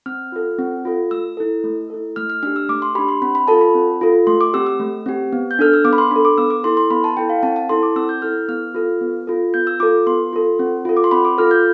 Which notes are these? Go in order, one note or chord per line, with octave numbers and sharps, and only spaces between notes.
C4 F6
F4 A4
C4
F4 A4
A3 E6
E4 A4
A3
E4 A4
A3 F6
F6
D4 G4 F6
E6
A3 D6
C6
D4 G4 B5
C6
C4 B5
B5
F4 A4 A5
B5
C4
F4 A4
A3 C6
D6
C4 G4 E6
E6
A3
C4 G4
B3
G6
D4 A4 F6
E6
B3 D6
B5
C6
D4 A4 B5
D6
B3 E6
D6
E4 A4 C6
C6
B3 B5
A5
E4 A4 G5
F5
C4 A5
A5
E4 A4 C6
D6
C4 E6
G6
E4 A4 F6
B3 F6
F4 A4
B3
F4 A4
B3 G6
E6
F4 A4 D6
B3 C6
F4 A4
C4
F4 A4
D6
C6
C4 B5
D6
F4 A4 F6
G6